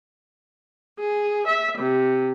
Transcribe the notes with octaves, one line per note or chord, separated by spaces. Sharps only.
G#4
E5
C3